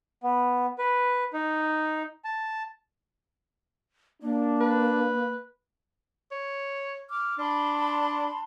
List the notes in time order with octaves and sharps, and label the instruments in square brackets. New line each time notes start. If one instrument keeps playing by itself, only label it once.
[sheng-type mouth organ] B3
B4
D#4
A5
[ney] A#3 [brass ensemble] D4
[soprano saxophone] B4
[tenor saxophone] C#5
[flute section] D6 F6
[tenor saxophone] D4 [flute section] A5 B5 C6